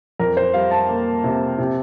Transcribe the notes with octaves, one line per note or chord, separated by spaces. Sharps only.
F2 A#4
C5
G3 F5
A5
A#3
C3
C3